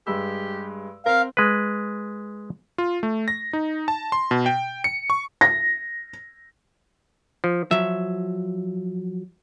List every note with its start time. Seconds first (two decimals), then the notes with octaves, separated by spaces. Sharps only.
0.07 G2 G#3 G4 E6
1.06 C4 A#4 F5
1.37 G#3 B4
2.78 F4
3.03 A3
3.28 A#6
3.53 D#4
3.88 A5
4.12 C6
4.31 B2
4.46 G5
4.84 C#7
5.10 C#6
5.41 A#6
7.44 F3
7.71 F3 F#3 E5